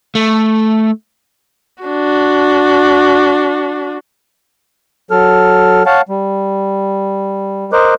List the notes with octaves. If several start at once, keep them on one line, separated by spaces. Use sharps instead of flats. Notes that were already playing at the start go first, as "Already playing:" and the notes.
A3
D4 F#4
F#3 A4 F6
C#5 F5 F#5 A5
G3
A#4 C5 D#5 D6 F#6